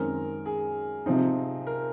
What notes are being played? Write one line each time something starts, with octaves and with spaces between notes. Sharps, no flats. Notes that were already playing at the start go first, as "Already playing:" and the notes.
Already playing: F#2 D#3 G#3 C4 A#4
G#4
C3 F3 C4 D#4
A#4